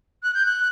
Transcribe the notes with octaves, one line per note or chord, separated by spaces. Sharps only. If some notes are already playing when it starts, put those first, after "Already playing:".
F#6
G6
F#6